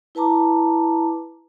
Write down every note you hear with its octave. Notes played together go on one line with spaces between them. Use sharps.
E4 B4 A5 A#5 D6